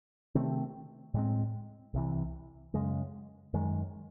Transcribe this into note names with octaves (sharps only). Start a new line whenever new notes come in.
C3 D#3 A3 C4
A2 G#3 C4
C2 C3 E3
F#2 C#3 G#3
F#2 D#3 G#3